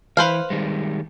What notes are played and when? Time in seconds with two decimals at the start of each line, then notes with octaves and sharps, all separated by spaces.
0.17 E3 B4 C5 F5
0.50 D#3 G3 G#3